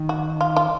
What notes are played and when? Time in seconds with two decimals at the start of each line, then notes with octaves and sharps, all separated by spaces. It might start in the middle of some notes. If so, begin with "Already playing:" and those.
Already playing: D#3
0.09 F#4
0.41 F4
0.56 F4